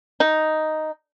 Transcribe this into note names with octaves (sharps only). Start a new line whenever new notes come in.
D#4